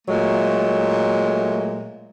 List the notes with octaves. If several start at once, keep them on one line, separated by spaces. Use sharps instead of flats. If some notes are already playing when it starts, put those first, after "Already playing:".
A#2 F#3 G#3 A3